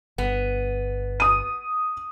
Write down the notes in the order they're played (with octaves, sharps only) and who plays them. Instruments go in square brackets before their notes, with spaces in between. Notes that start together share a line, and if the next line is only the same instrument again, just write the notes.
[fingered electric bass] G1 [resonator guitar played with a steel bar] B3
[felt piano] D#6 D#7